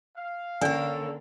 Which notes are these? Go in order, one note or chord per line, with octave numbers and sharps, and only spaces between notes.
F5
D3 A#3 C#4 A4 C#5 D5 G#5